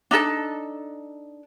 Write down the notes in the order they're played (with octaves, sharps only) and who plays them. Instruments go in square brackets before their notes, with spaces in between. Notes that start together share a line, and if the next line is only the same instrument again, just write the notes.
[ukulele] D4 D#4 A4 A5